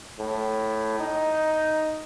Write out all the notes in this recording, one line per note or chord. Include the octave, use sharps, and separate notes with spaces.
A2
D#4